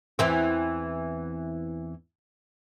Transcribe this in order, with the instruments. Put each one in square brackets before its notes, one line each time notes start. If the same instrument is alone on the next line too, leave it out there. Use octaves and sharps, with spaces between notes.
[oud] E2 E3 C4